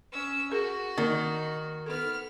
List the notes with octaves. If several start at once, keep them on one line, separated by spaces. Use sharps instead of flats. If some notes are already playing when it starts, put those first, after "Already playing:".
C#4 E6
F#4 G#4 A#4
D#3 A#3 A#4 D5
B3 A4 F6